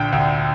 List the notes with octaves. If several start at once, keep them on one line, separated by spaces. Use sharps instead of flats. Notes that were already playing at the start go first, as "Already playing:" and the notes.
Already playing: A#1 D3 G5
D2